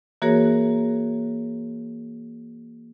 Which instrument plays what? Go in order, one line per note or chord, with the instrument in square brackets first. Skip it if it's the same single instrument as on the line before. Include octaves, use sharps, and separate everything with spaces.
[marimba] E3 A#3 F#4 G#4 A#4 C#5